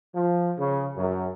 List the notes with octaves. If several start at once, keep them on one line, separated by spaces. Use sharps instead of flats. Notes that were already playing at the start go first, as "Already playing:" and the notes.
F3
C#3
F#2